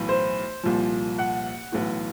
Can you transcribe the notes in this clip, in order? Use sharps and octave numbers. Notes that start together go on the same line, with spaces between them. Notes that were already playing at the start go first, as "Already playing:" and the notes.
Already playing: B1 A2 E3
C5
C2 A#2 F3
F#5
B1 A2 E3